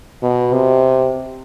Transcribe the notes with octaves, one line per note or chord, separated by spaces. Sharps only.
B2
C3